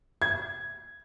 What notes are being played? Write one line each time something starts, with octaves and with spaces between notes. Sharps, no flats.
G#6